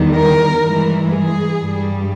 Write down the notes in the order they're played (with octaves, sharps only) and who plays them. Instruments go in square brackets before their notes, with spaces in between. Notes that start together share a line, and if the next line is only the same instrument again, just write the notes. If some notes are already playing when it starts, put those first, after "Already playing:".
Already playing: [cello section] E2 D#3 G3
A#4
G2 E3 G#3
G#4
G2 G3